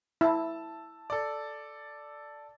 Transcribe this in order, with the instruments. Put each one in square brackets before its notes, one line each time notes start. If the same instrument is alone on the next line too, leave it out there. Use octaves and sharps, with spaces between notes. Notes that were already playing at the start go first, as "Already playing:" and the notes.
[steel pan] E4 [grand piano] A5 E6
[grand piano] A4 D5